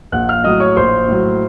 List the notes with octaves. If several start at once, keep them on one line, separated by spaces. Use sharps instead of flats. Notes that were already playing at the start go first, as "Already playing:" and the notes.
A#1 F#5 F#6
F5 F6
A2 F#3 D#5 D#6
C#5 C#6
A#1 C5 C6
A2 F#3